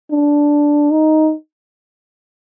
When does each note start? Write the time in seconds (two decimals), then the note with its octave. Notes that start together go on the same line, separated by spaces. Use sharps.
0.11 D4
0.91 D#4